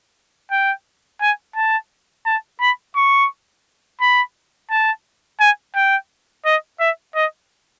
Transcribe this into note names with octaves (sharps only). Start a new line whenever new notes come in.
G5
G#5
A5
A5
B5
C#6
B5
A5
G#5
G5
D#5
E5
D#5